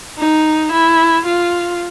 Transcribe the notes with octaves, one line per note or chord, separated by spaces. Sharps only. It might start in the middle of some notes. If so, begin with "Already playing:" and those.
D#4
E4
F4